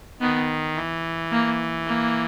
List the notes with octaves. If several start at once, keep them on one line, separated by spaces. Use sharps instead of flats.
D#3 B3
E3
A#3
A#3